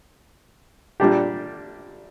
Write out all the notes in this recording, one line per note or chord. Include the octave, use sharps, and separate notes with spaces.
A#2 G3 D4 G4